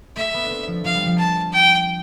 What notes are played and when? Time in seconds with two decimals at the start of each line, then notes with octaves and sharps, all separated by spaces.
0.16 A3 E5
0.34 B3
0.46 C4 D4
0.67 F3
0.85 F3 F5
0.95 G3
1.06 F3
1.18 A5
1.53 G5